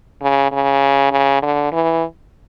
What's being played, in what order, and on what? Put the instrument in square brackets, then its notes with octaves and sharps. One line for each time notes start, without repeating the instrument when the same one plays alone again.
[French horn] C#3
C#3
C#3
D3
E3